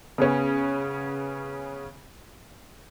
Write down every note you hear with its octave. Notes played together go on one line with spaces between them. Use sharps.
C#3 B3 C#4